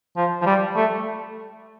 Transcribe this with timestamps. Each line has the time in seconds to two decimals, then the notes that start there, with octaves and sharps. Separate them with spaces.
0.16 F3
0.42 F3
0.46 G3
0.76 A3